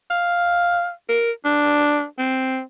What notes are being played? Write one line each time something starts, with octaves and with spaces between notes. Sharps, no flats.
F5
A#4
D4
C4